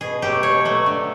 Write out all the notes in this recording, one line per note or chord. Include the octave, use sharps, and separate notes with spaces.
B2 G#4
F#3 A3 G4
B2 C#5
F#3 A3
D3